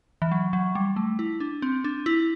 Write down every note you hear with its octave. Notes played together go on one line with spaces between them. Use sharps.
E3
F#3
F#3
G3
A3
E4
D4
C4
D4
E4